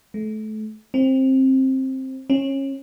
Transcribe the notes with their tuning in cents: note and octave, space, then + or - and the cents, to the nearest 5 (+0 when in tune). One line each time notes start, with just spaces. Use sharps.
A3 -30
C4 +15
C#4 -25